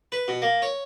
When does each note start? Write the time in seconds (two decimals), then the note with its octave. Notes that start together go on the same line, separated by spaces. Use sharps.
0.12 B4
0.28 B2
0.42 A#3
0.62 C#5